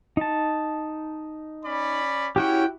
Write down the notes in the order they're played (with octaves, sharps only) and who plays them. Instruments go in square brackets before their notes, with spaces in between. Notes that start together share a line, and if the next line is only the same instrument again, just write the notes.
[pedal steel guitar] D#4 A5
[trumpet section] C#4 D5 B5
[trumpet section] C#4 C#5 G5 [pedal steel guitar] E4 F#4 G4